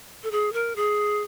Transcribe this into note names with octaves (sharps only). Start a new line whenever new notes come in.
A4
G#4
A#4
G#4